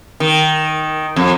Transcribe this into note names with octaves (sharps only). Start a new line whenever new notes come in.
D#3
F2